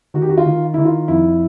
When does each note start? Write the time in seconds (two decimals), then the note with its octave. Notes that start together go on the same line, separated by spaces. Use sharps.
0.14 D#3 F#4
0.22 G4
0.29 F#4
0.37 F4
0.46 D#3
0.74 D#3 E4
0.85 F4
1.08 F2 E4